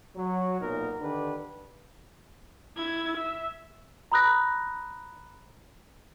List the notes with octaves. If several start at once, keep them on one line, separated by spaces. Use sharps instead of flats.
F#3
B1 A#2 B3 D#4 A#4
D3 D#3 D4 G4 B4
E4 G#6
E5
A#5 B5 D#6 F#6 A#6